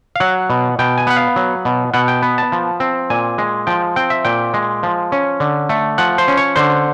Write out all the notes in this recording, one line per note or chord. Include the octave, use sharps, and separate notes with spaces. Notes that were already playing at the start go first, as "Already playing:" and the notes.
F5
F#3 F#5
B2
B2 G5
G#5
B3 F#5
F5
F#3
B2
B2 F#5
G5
B3
A5
F3
C4
A#2 G#5
G#3
F3 G5
C4 G5
E5
A#2 G5
G#3
F3
C#4
D3
A3
F3 F#5
C5
C#4
C#5
D3 C5